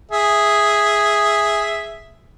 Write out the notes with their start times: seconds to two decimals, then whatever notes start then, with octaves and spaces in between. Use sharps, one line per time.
0.11 G#4 E5